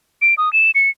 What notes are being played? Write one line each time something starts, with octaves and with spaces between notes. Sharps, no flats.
D7
D#6
E7
C#7